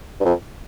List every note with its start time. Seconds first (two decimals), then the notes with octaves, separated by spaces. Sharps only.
0.20 G2
0.25 F2